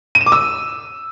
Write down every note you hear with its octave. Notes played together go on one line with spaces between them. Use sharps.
D#7
E7
D6
E6